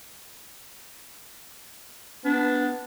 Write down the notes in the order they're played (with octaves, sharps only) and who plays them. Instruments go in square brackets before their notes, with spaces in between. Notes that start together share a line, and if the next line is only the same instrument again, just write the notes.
[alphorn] B3 [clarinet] D4